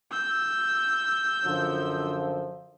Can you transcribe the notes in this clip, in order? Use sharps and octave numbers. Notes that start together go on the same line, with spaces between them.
E6 G6
F#2 D3 F3